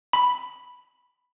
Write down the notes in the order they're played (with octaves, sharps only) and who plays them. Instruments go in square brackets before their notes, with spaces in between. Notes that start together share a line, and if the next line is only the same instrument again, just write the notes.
[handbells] B5